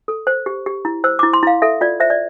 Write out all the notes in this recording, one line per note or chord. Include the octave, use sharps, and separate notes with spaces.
A4
C5
G4
G4
E4
C5 E6
E4 D6
C6
E4 F5
A4 E5
F4 D5
C5 E5
D5